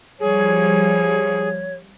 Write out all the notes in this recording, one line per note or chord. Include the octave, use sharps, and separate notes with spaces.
F3 G3 G#4 C#5